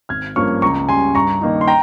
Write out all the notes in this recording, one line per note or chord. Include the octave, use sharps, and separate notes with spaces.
G#1 F6 G#6
G2 F3 A#3 C#4 C#6 F6
C#2 A#5 C#6
C#3 G3 G#5 C6
G2 A#5 C#6
D#3 A#3 D#4
C6
G5 A#5